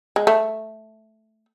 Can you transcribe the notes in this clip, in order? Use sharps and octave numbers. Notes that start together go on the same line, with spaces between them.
G#3
A3